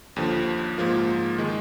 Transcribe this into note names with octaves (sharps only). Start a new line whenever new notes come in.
D#2 D3 F3
G#2 F3 A#3 F4
D#3 G#3 D#4